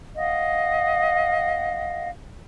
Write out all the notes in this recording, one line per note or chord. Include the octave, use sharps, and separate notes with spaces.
D#5 F5 F#5